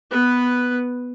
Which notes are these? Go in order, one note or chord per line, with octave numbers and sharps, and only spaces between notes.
B3 B4